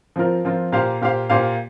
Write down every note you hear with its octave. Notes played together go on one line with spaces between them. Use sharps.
F3 C4 F4 A#4
F3 C4 F4 A#4
A#2 A#3 G4 C5 F5
A#2 A#3 G4 C5 F5
A#2 A#3 G4 C5 F5